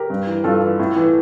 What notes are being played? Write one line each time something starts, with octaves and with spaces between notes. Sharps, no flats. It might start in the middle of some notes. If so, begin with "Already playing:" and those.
Already playing: G4 A#4
G2
E3
G2 F4 A4
E3
A2
E3